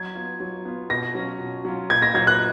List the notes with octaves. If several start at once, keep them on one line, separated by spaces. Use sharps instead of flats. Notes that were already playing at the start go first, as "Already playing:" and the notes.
Already playing: F#3 G#6
B3 F4
F#3
B3 F4
B2 A#6
F#3 C#4 F4
B2
F#3 C#4 F4
A#2 G#6
A#6
F#3 A#3 F4 G#6
F#6